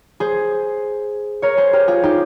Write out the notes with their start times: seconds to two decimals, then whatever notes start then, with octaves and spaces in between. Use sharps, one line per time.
0.20 G#4 C5
1.42 A#4 C#5
1.57 G#4 C5
1.73 G4 A#4
1.88 F4 G#4
2.03 D#4 G4